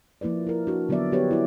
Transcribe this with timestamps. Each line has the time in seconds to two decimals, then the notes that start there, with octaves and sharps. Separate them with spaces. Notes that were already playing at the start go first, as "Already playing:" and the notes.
0.21 F3 A#3 E4 B4 D5
0.47 E4 A#4
0.67 D4 F#4
0.89 D3 F#3 B3 D4 D5 E5
1.12 B3 F#4 G4 B4 C#5
1.31 E4 D5